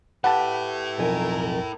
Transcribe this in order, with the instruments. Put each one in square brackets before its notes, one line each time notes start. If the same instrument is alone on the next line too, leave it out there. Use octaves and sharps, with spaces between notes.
[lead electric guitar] E4 A4 [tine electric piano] G4 B4 [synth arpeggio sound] F#5 A5
[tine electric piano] B1 F2 G#5 [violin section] A#4